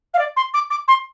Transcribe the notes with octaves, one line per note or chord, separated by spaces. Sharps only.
F5
D5
C6
D6
D6
C6